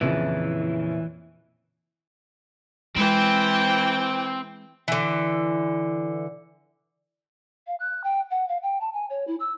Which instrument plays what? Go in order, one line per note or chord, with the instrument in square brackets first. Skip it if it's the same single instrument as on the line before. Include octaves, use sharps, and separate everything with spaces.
[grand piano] F2 C#3 F3 [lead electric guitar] A#2 E4 [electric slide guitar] E3
[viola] E3 G5 [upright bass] G#3 [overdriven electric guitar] C4
[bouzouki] D3 E3
[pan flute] F5
F#6
G5
F#5
F5
G5
A5
G#5
C#5
E4
E6